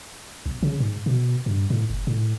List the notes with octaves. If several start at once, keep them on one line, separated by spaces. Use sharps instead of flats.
B1
C#3
G#2
B2
G2
A2
F#1
A2